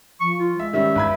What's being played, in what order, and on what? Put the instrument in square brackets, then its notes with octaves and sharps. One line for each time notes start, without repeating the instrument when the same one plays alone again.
[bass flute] F3 [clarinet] C#6
[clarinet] F4
[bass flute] G#3 [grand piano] E5
[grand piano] D#3 G3 C#4 [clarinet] E5
[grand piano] G1 B5 G#6